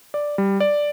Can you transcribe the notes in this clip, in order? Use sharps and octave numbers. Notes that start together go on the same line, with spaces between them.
D5
G3
D5